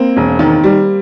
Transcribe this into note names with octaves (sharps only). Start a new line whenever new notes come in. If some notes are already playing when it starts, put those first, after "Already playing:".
Already playing: A#3 C4
E1
D#3
G3